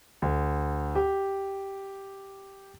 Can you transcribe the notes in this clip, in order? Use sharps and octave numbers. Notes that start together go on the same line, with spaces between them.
D2
G4